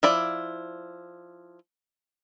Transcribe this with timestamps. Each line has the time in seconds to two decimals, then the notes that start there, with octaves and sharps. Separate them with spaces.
0.03 F3 E4 D5